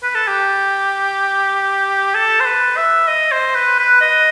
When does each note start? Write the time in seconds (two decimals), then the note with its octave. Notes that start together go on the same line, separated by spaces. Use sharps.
0.03 B4
0.15 A4
0.28 G4
2.15 A4
2.40 C5
2.45 B4
2.77 E5
3.08 D#5
3.31 C5
3.55 B4
3.79 B4
4.01 D#5